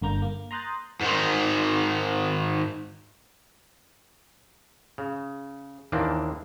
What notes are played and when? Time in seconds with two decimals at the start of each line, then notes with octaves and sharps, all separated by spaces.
0.01 G1 D3 A#3 A#5 G6
0.22 A#3
0.51 A#5 C6 D#6 F#6 G6 A6
1.01 G#2 D#3
4.98 C#3
5.92 D#2 D#3 E3 A#3 C4 D4